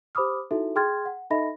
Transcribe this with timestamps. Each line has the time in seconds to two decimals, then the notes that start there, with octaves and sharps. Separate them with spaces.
0.15 G4 C5 B5 D6 D#6 F6
0.51 D#4 E4 F#4 A4 E5
0.76 G#4 G5 C6 F6 G#6 A6
1.06 F#5
1.30 D#4 A4 D#5 E5 B5 A#6